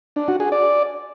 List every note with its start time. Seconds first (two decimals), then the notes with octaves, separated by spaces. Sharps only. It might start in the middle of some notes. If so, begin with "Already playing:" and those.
0.16 D4
0.28 F#4
0.40 G#4
0.52 D5